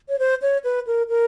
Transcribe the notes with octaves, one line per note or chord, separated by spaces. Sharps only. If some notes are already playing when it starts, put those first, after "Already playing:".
C#5
C5
C#5
B4
A#4
A#4